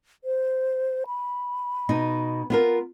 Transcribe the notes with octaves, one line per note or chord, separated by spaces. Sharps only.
C5
B5
B2 D#4
B3 F4 A#4